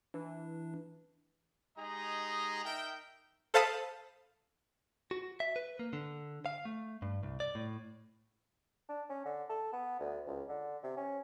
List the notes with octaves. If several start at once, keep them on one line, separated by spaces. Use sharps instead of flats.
E3 D4
G#3 D#4 G4 G#4 D#5 A#5
D#4 A#4 E5 G5
A4 C5 F5 A5 B5 D#6
F#4
E5
B4
A#3
D3
F5
A3
G2
C2
D5
A2
D4
C#4
D3
A4
B3
D2
C#2
D3
C3
C#4